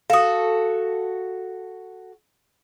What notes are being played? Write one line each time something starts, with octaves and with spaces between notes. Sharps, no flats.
F#4 A4 F5 D#6